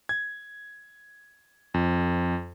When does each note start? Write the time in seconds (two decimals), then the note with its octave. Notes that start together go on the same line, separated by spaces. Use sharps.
0.09 G#6
1.74 F2